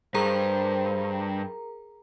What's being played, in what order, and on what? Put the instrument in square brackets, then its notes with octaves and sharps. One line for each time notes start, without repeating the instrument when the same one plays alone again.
[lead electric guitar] G2 [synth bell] G#4 A#4 A#5 [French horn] C5